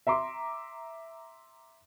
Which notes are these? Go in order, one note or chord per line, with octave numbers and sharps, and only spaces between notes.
E5 A#5 C6 D6